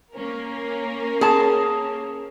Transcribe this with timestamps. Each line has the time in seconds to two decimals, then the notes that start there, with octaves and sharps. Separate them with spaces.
0.13 A#3 C#4 A#4
1.21 G#4 A5